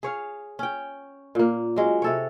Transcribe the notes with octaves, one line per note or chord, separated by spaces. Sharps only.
G#4 C#5 F5
C#4 G5
A#2 A#3
F#3 G#3 C#4
C3 A4 C#5